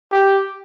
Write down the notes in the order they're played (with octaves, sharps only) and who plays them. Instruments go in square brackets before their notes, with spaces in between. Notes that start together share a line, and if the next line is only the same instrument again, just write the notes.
[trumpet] G4